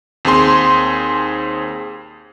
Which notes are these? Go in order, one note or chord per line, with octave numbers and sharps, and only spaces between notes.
D#2 C4 G#4 C6